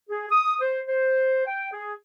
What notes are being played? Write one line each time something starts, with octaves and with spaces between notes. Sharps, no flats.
G#4
D#6
C5
C5
G5
G#4